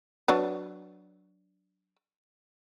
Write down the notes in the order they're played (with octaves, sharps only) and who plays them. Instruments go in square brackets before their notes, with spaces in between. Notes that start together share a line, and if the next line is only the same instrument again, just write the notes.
[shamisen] F#3 D4 B4